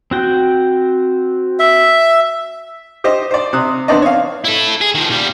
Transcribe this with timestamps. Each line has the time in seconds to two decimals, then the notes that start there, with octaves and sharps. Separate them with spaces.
0.11 C4 F#4 G5
1.59 E5
3.04 G4 C5 D#5
3.31 C5 D5
3.53 C3 D#6 F#6
3.88 B3 C4 D4 D5 D#5
4.02 C#5 F5
4.44 E4 A4
4.81 G#4
4.95 D#3 F3
5.10 A#2 G3